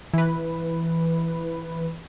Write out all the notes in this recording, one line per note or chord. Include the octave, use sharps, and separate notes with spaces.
E3 B4